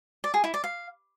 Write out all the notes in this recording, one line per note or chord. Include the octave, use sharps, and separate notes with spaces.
D5
G#4
E4
D5
F5